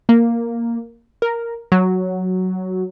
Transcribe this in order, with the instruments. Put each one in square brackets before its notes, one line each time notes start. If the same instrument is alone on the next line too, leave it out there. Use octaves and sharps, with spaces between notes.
[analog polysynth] A#3
A#4
F#3